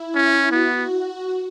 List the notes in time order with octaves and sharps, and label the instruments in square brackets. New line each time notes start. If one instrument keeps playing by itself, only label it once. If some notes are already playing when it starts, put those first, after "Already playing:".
Already playing: [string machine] E4
[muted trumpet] C#4
[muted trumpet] B3 [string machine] F#4